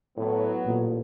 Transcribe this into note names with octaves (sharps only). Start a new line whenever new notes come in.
A2 F#3 B3
A1 A#2